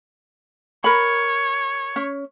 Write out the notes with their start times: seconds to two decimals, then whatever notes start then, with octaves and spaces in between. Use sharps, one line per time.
0.84 A#4 C#5 B5
1.96 C#4